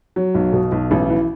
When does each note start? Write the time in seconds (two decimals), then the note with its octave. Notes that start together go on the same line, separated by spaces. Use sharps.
0.16 F#3
0.35 B1
0.53 B2
0.72 B1
0.91 A1
1.10 E3